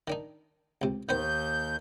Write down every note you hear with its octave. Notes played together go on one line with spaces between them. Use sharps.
D#3 D4 D#4
C#2 C3
D#2 D#3 B3 C5 G6